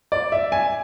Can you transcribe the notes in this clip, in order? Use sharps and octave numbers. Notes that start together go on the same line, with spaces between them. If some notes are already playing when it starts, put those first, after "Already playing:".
D5
E5
G#5